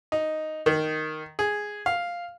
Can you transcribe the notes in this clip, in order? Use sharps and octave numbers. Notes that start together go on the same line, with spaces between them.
D#4
D#3
G#4
F5